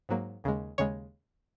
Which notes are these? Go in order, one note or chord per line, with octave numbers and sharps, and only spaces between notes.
G#2 F#3 A#3
D#2 C#3 G#3
D#2 C#3 G#3 C#5